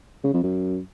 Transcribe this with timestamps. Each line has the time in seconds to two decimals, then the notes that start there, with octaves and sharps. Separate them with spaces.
0.24 C#3
0.33 F2
0.43 F#2